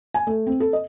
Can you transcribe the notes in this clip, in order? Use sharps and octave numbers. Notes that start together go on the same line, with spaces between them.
G#5
A3
C4
A4
D#5